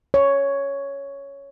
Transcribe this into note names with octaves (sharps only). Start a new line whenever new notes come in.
C#5